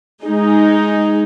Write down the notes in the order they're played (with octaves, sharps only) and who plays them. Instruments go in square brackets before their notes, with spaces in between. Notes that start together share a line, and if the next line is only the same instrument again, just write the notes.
[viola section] G#3 D#4 G#4